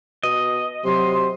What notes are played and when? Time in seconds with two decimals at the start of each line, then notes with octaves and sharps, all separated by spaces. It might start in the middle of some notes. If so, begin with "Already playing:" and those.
0.23 B2 D#5
0.84 C3 F#3 C6